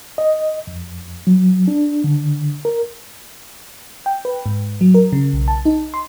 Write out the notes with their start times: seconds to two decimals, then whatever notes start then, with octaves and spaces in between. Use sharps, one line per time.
0.18 D#5
0.67 F2
1.27 F#3
1.68 D4
2.04 D3
2.65 A#4
4.06 G5
4.25 B4
4.46 G#2
4.81 F#3
4.94 A#4
5.13 C#3
5.33 B1
5.48 A5
5.65 D#4
5.94 C6